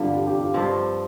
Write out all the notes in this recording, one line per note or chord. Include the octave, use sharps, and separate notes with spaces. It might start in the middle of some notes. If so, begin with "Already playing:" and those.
Already playing: G2 D3 G3 D4 F4
G4
G4
F4
G2 F3 C4